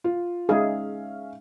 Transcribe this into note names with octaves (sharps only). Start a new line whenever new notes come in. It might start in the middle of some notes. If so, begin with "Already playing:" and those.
F4
G#3 C#4 D#4 G#4 E5 F5